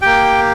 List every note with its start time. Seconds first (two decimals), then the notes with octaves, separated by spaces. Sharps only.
0.02 A#3 G4 G5